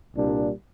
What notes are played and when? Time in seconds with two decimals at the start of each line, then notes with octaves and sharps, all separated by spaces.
0.14 C2 A#2 G3 D4